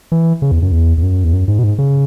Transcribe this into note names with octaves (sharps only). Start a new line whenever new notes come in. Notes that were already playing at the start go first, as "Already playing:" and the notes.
E3
C#3
E2
F#2
E2
E2
F#2
E2
F#2
G#2
B2
G#2
C#3